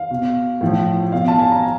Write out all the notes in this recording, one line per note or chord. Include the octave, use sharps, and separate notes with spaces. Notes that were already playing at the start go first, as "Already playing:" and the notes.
Already playing: F5
B2
A2 F3
B2 F5
A5
G#5
A#5